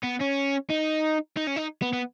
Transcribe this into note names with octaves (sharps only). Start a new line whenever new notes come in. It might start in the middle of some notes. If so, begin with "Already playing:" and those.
B3
C#4
D#4
D#4
C#4
D#4
B3
B3